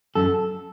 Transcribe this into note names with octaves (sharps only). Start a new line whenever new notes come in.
F#2 A4